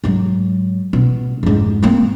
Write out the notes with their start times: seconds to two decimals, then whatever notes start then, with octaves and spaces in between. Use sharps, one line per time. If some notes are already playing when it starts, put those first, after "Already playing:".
0.04 G#2 F#3
0.93 B2
1.43 F2 G#2
1.83 A#3 C4